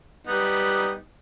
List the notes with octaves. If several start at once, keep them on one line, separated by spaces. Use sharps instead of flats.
G3 B3 D#4